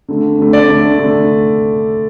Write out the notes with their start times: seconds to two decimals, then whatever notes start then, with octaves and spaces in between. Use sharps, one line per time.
0.08 D3 A3
0.38 D3 A3
0.53 D5
0.68 D3 A3
0.98 D3 A3